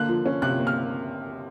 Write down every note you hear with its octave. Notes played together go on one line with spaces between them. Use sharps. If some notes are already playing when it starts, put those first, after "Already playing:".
Already playing: D3 A#3 F#6
F3
C#4
C3 F#6
A#3
F6